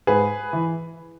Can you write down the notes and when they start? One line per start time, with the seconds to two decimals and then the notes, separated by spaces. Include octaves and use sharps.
0.07 G#2 G#4 B4
0.53 E3